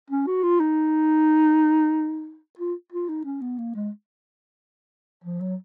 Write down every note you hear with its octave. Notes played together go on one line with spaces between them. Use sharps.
C#4
F#4
F4
D#4
F4
F4
D#4
C#4
B3
A#3
G#3
F3
F#3